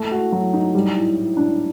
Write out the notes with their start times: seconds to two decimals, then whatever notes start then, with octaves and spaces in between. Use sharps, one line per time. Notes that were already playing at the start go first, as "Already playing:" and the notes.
Already playing: A3
0.11 F#4
0.32 F#3
0.53 D#4
0.75 G3
0.96 A2
1.16 A2
1.37 D4